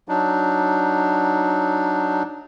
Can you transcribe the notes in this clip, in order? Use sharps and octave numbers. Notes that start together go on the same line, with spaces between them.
F#3 D4 D#4